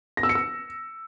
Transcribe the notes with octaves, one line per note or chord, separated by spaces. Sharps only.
A#6
E6
C#7
E6